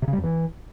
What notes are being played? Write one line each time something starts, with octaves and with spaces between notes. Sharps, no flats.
C3
C#3
G3
F2
E3